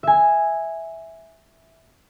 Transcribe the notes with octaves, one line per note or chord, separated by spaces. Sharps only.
E5 G#5